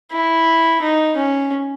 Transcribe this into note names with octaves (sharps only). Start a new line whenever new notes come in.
E4
D#4
C#4